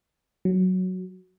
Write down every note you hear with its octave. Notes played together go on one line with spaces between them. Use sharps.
F#3